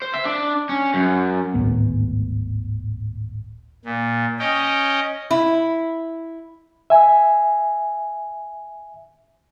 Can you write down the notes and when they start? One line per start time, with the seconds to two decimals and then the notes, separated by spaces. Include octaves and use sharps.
0.02 C5
0.14 E5
0.25 D4
0.69 C#4
0.94 F#2
1.54 D1 G#1 A2 B3
3.85 A#2
4.39 C#4 D#5 G5
5.31 E4
6.90 E5 G#5